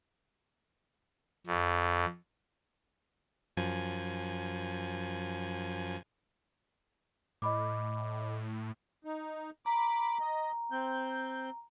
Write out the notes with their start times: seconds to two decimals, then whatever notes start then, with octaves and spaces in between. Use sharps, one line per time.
1.47 F2
3.57 F#2 F3 G#5
7.42 A2 D#5 B5 D6
9.05 D#4
9.66 A#5 B5 D6
10.21 D#5
10.72 C4 G6